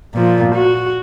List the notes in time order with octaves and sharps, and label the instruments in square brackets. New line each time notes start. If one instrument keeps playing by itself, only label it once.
[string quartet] A#2 F3
F#4